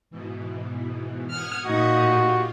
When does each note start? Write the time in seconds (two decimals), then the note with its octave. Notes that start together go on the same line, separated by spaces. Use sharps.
0.10 G#2 B2 E3
1.29 F#5 D#6 F6 G#6
1.66 A#2 D#4 F#4
2.01 F4 G4